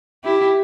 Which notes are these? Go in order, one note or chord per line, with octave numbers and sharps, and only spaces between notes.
E4 G4